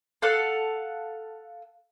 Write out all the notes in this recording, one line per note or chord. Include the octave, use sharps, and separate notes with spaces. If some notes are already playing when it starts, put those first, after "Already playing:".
A4 F5 F#5